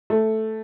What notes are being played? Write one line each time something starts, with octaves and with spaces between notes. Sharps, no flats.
A3